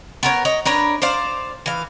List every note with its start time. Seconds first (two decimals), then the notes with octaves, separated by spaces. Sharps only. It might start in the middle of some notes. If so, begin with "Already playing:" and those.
0.23 B3 A#4 C#5
0.45 C#5 D#5
0.65 D4 A#4 B4 C#5
1.02 C5 D5 F5
1.66 E3 F5